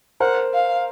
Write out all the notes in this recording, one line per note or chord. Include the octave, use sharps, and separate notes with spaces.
A#4 C5 F#5
F5